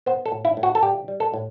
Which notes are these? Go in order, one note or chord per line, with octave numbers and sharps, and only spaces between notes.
B3 C5
A4
A2
E4
A2
F#4
A4
G3 G4
G3
A4
A2